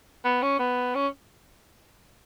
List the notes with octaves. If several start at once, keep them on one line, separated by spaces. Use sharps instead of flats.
B3
C#4
B3
C#4